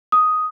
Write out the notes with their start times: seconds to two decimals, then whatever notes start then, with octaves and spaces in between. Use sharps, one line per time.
0.12 D#6